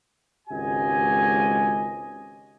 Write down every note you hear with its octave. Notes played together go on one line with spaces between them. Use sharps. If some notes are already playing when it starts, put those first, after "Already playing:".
G#1 C#2 F#4 G4 D#5 G#5